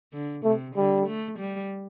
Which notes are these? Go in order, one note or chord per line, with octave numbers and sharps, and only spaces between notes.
D3
C3 A3
D3 G3
A3
G3